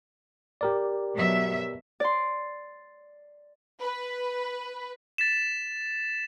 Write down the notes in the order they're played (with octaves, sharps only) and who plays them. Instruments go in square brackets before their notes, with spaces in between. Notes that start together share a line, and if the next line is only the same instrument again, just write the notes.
[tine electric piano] G4 A#4 D5
[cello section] B2 F#3 E5
[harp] D5 C6
[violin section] B4
[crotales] A6 B6 E7